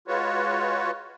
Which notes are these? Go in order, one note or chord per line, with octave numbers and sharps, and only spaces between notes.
G#3 F4 F#4 B4 C#5